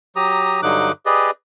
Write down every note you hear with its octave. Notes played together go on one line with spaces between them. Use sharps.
F#3 G4 A#5 D#6
G2 D3 F#3 D#4 D6 F#6
G4 G#4 B4 D5 D#5